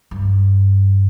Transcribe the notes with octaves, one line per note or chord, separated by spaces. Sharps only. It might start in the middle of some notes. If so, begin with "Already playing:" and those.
G2